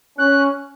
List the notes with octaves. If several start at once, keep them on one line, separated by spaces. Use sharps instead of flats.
C#4 F#6